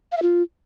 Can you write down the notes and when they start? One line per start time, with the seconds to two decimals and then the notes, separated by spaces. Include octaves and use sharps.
0.12 F5
0.17 E5
0.22 F4